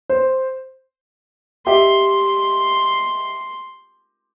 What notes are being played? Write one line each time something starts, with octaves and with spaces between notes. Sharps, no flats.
C5
G4 D#5 E5 C6